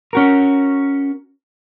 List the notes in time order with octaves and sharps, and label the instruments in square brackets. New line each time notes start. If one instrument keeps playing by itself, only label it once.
[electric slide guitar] C#4 F#4 A#4